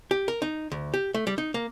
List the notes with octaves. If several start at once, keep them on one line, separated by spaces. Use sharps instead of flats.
G4
A#4
D#4
D2
G4
A3
G3
D#4
A#3